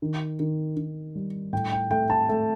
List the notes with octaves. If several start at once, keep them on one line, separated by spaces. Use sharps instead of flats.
D#3
D#3
D#3
G3
A2 G5
G5
A3 G5
A5
A3